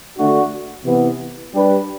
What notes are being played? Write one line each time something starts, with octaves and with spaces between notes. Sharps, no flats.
D3 A3 D4 F#4
C3 E3 B3
G3 D4 G4 B4